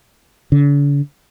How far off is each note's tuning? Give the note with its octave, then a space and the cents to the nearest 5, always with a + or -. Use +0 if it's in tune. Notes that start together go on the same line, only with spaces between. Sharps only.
D3 -45